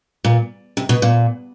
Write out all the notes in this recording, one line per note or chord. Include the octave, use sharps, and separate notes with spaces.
A#2
C3
B2
A#2